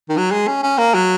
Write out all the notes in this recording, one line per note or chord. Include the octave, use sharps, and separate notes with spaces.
D#3
F#3
G#3
C#4
C#4
A#3
F#3